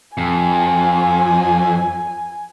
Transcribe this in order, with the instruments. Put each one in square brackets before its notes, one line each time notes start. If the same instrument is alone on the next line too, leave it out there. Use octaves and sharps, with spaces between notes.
[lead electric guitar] F2 [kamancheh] G#5